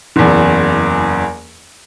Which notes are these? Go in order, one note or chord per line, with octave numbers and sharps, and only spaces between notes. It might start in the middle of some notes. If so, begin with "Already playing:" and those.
F#1 E2